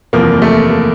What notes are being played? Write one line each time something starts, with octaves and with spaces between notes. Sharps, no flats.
F#1 E2 C3 F3 A#3
A3
A#3